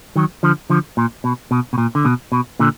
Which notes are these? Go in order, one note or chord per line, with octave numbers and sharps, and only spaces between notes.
D#3 F#3
D3 F3
D3 F3
A#2
B2
B2
B2
A#2
D3
B2
B2
A#2 D3